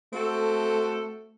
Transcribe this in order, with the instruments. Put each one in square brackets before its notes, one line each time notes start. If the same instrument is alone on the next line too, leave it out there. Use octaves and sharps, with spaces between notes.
[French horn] A3 [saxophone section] C4 F#4 A4